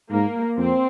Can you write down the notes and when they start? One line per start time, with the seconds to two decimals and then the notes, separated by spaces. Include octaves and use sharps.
0.11 G#2 A#3
0.57 F2 C4